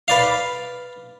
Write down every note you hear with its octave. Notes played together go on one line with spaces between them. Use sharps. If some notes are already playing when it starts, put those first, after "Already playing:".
B4 D5 F5